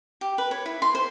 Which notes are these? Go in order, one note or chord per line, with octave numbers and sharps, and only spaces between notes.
G4
B4
C#5
E4
C6
C5